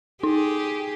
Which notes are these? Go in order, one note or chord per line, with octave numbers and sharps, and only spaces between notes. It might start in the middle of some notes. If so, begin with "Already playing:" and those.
D#4 G4 G#4